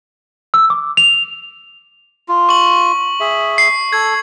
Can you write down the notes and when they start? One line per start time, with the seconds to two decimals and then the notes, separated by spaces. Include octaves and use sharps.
0.54 E6
0.70 D6
0.97 F7
2.29 F4
2.49 C#6 F#7
3.20 G#4 E5
3.58 C7
3.93 A4 G#6